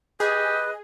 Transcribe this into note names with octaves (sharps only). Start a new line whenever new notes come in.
G4 G#4 B4 D#5